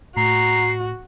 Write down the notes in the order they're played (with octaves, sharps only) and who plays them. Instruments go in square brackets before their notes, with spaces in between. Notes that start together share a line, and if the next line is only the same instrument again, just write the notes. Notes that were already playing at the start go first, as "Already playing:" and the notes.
[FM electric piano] A2 [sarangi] F#4 [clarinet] A#5 [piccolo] C7